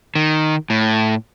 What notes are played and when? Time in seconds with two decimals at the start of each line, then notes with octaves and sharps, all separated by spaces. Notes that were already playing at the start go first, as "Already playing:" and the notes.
0.15 D#3
0.70 A2